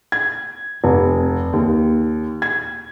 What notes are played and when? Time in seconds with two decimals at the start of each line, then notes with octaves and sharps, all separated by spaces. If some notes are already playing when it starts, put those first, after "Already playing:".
0.12 G#6
0.84 F1
1.53 D#2
2.42 G#6